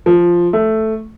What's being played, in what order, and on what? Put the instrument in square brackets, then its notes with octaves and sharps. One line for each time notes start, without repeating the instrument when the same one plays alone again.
[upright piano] F3
A3